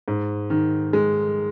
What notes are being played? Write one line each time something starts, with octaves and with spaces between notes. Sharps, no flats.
G#2
D#3
G#3